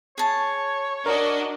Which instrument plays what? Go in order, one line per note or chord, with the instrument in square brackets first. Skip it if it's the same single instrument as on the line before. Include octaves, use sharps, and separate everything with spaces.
[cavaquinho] G#4 A5 [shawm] C#5
[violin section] D4 F#4 D#5 [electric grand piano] A#4